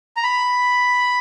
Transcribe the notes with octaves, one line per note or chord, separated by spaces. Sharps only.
A#5
B5